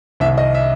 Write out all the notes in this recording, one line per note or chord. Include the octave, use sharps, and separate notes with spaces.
C2 C3 D#3 E5
D#5
E5